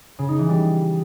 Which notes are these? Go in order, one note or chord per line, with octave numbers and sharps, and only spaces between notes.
C#3
D#4
E3
G3